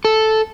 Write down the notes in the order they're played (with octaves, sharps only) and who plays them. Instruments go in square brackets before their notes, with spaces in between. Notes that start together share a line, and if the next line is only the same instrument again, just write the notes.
[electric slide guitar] A4